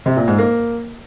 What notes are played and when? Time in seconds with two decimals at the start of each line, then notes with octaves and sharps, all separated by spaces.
0.06 C3
0.17 A#2
0.27 G#2
0.38 A#3